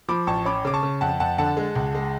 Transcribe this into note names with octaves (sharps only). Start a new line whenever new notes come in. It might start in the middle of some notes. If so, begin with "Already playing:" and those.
F3 B5 D6
A1 A5 C#6
C#4 B5 D6
C#3 D6
A5 C#6
C#3
F2 F#5 A5
F2 F#5 A5
D3 F#5 A5
G#3
C#2
G#3